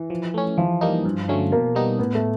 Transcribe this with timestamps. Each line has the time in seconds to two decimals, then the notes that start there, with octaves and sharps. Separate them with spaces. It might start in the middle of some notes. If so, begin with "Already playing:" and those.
Already playing: E3
0.10 F3
0.34 A3 C#4
0.57 E3 F3
0.81 G3 A#3 D#4
1.05 G2
1.28 D3 F#3 A3 C#4
1.52 B2 A#3
1.75 G3 B3 D#4
1.99 A2 B3
2.15 A3